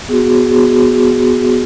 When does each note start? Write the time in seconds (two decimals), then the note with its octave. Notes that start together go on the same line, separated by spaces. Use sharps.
0.09 B3 F#4 G#4
0.51 B3 F#4 G#4